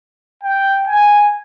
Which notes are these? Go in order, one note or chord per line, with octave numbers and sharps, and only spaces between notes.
G5
G#5